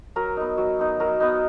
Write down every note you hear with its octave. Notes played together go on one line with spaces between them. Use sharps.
F#3 A#4
B3 D#4
F#3
B3 D#4
F#3 A#4
B3 D#4